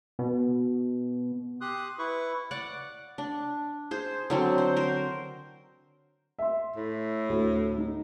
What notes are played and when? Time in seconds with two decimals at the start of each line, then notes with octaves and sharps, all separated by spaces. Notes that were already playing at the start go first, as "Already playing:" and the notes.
0.19 B2
1.61 G4 C6 D#6 F#6
1.99 E4 B4 C#6
2.51 D5 F#5
3.18 D4
3.91 G#4 C5
4.30 D3 F#3 C4
4.58 C5
4.76 A#4 C5
6.39 E5 C6
6.76 A2
7.29 D2
7.78 D#4